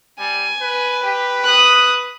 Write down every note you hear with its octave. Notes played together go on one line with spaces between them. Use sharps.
G3 G#5
B4
G4
D#6 F#6